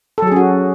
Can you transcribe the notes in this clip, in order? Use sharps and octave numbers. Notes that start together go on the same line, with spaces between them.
F#3 C#4 F#4 G#4 A4